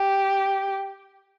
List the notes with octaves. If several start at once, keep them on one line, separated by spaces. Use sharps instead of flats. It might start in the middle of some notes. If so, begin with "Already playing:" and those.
Already playing: G4